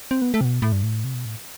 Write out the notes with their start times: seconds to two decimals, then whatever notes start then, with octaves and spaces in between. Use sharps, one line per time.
0.11 C4
0.22 B3
0.34 A3
0.41 C3
0.45 B2
0.62 A2
0.72 G2
0.83 A2
1.04 C3
1.14 B2
1.26 A2